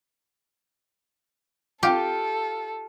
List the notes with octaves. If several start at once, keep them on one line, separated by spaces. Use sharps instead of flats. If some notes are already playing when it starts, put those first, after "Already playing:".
F4 G4 A4 F5 G5